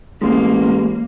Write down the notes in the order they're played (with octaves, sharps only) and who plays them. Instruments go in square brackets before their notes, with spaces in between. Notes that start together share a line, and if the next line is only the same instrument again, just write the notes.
[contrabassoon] A1 [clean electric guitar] G#3 [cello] A#3